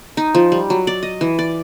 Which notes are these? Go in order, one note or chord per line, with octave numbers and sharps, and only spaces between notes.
D#4
F3
G3
F#3
D5
D#5
E3
D5